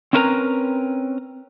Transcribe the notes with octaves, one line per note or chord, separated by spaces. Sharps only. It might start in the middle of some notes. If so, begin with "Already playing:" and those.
C4 C#4 E4 A#4 B4 A#5